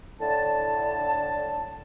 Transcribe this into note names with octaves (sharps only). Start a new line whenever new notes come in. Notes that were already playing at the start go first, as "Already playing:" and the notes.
A2 D3 A5